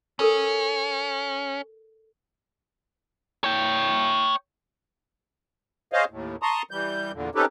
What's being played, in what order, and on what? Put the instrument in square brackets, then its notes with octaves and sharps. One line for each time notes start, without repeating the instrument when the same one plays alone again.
[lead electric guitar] C#4 [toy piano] A4 A#4 E6
[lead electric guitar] C#5 G5
[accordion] G#4 C5 C#5 D#5 F5
D#2 A2
A5 A#5 C6 C#6 D#6
E3 G3 G6
E2 A#2 D3
C4 C#4 D#4 G4 A4 B4